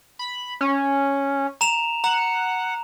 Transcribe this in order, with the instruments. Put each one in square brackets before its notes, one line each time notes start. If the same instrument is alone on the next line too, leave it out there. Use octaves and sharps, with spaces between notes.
[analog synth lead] B5
C#4
[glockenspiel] A#5 E7 F7
[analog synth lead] F#5 [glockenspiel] A#5